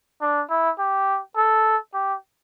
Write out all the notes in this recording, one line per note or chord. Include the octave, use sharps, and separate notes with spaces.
D4
E4
G4
A4
G4